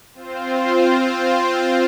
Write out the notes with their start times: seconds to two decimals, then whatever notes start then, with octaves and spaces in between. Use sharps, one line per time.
0.14 C4 F4 C5